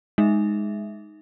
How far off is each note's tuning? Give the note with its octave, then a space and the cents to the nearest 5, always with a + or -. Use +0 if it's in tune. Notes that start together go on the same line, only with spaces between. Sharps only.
G#3 +0 D#4 +0 E5 +0